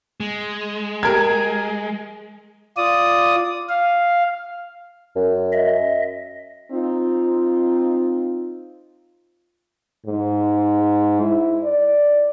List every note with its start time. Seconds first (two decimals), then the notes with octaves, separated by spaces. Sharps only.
0.20 G#3
1.03 G4 A#4 G#6
2.77 F4 D5 D#6
3.69 F5
5.16 F#2
5.52 D#5 E5
6.72 C4 D#4 F4
10.06 G#2
11.21 E4
11.63 D5